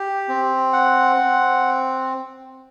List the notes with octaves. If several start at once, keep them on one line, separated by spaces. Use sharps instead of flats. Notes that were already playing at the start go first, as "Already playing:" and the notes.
Already playing: G4
C4
F#5
C4